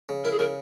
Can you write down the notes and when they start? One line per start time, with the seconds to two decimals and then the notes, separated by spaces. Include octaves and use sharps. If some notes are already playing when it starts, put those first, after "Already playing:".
0.09 C#3
0.24 E4 A#4
0.32 G#4
0.39 C#3 A#4